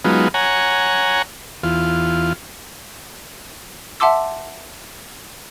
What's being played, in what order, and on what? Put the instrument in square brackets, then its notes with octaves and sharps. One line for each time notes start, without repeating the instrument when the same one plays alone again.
[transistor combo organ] F#3 G#3 B3 D#4 F4
C#5 F#5 G#5 A#5
E2 F4
[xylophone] E5 F#5 A5 C6 D6 E6